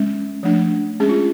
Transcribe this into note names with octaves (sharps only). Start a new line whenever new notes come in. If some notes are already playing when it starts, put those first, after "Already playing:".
Already playing: G#3 C#4
F3 A3 D4
G#3 C#4 G#4
F4